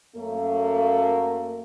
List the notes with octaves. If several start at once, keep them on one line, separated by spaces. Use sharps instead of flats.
F#2 A3 A#3